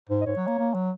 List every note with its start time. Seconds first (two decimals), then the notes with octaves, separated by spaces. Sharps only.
0.09 G#2
0.21 D#5
0.26 G#2 C#5
0.36 F#3
0.47 A#3
0.58 A#3
0.74 F#3